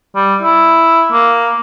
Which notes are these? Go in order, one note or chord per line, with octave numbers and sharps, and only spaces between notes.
G3
E4
A#3